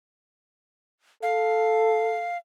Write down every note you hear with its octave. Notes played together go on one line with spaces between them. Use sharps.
A4 F5